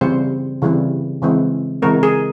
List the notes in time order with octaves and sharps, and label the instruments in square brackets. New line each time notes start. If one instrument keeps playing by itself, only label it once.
[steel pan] C#3 E3 G3 C4 C5
C#3 E3 G3 C4
C#3 E3 G#3 C4
C#3 E3 G#3 C4 A#4
G#4